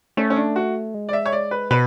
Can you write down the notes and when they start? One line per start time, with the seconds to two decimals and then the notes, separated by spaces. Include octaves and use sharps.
0.17 A3 C#4
0.30 C#4
0.36 D4
0.56 F#4
0.94 G#3
1.09 D5
1.13 E5
1.26 C#5
1.33 D5
1.51 B4
1.71 B2 B4